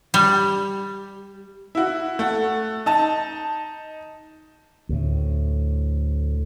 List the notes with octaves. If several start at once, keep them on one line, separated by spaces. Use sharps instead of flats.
G3
E4 F#4
A3 F#5
D#4 A5
D2 A2